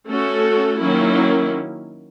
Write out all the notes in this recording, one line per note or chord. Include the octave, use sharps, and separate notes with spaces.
A3 C#4 F#4 A4
D#3 F#3 A#3 C#4 E4